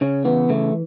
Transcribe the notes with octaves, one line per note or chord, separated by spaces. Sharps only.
C#3 C#4
E3 B3
C#3 A3